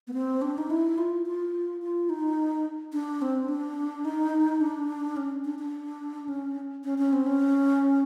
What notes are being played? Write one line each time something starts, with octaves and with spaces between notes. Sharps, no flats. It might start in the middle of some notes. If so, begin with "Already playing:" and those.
B3
C4
D4
D#4
E4
F4
F4
F4
D#4
D4
C4
D4
D#4
D4
C#4
D4
D4
C#4
C#4
C#4
C4
C#4